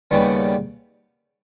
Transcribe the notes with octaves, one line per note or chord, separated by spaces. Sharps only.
D#2 C#3 G3 B3